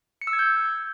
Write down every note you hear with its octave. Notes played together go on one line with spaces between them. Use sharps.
C#7
E6
G#6
G6